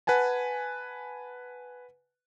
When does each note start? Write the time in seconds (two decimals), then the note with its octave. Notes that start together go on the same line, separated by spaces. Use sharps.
0.07 B4 F#5 G#5 A5